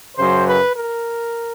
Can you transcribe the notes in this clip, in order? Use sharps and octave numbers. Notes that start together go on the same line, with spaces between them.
F#2 C#3 F#3 C5
B4
A#4